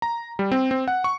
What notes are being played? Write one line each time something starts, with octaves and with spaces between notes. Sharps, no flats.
A#5
G3
C4
C4
F#5
C#6